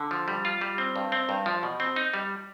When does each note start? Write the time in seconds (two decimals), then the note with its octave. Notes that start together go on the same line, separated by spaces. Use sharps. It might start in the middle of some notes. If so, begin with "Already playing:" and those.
Already playing: D3
0.11 F3
0.28 G3
0.45 F4
0.61 G3
0.78 C4
0.96 G2
1.12 C4
1.29 G2
1.46 F3
1.63 B2
1.80 C4
1.96 D#4
2.14 G3